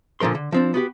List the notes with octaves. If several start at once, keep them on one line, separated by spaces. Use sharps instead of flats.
A#2 D3 F3 A#4 C6
D3
F3 C4 D4
B3 F#4 G4